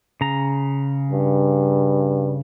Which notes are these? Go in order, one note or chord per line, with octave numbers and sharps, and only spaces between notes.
C#3 A#5
G2